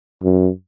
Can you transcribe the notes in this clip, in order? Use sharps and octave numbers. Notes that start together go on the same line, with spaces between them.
F#2